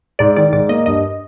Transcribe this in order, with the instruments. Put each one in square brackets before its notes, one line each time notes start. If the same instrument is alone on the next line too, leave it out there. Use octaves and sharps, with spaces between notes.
[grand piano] G#2 [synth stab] D5
[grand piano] D#3 [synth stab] D5
[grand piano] G#2 [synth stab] D5
[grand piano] A#3 [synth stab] D#5
[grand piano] G2 [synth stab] D#5